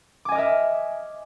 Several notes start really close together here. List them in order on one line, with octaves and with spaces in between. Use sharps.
D6 G#5 D#5 F6 E5